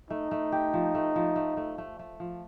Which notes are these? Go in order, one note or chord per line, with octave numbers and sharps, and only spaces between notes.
A3 D#4
A3
G4
F3
A3
F3
A3
A3
A3
A3
F3